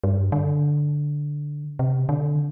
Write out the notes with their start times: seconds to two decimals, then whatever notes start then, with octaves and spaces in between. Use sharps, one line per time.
0.04 G2
0.32 D3
1.79 C3
2.09 D3